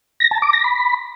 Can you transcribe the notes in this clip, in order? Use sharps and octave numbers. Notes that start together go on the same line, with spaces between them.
A#6
A5
D6
A#6
B5